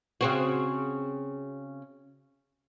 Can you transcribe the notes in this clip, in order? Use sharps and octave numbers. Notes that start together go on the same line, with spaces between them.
C#3 C4 F#4